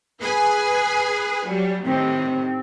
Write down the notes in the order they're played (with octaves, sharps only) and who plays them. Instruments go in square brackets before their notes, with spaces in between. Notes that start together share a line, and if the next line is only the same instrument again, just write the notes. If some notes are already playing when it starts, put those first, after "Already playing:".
[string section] G#4 B4 G#5
F#3 G3
[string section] A2 C3 D#3 [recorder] C4